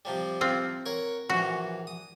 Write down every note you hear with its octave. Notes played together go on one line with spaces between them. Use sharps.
C3 F3 G3
C4 F4
A#4 C#5 F#5
A#1 E3 F#4
D#6